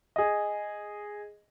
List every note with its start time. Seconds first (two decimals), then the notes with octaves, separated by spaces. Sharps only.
0.16 G#4 D#5